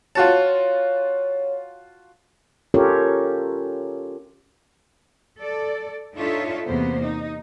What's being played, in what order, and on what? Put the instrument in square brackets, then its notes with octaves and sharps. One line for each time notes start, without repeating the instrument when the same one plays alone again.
[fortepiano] F4 F#4 A5 [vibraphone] C#5
[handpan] C#4 F4 G4 A4 A#4 C#5
[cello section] A4 D5
D4 D#4 F4 A4 C#5 E5
E2 C3 A#3 B3 C5
D#4